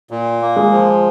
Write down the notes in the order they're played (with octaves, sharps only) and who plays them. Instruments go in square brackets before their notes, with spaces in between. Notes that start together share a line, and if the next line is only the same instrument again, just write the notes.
[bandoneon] A#2
A#3
[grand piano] G#3
[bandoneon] F3